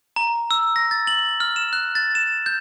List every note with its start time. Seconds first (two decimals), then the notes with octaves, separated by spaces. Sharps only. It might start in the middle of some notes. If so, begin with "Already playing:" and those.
0.16 A#5
0.51 E6
0.76 A#6
0.91 A6
1.07 F#7
1.40 F6
1.56 E7
1.73 F#6
1.95 A6
2.15 E7
2.46 G6